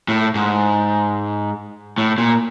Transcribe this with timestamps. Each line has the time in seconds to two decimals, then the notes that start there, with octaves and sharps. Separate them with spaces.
0.08 A2
0.35 G#2
1.98 A2
2.18 A#2